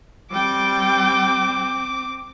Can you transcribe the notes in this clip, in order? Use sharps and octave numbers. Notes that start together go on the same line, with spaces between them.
G3 C4 G5 D6